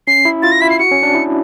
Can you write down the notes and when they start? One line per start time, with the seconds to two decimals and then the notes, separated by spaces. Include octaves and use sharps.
0.07 C#4 C7
0.25 E4
0.42 F4 A6
0.52 A#6
0.61 E4 B6
0.70 C7
0.79 F#4 C#7
0.92 C#4
1.03 D4
1.15 E4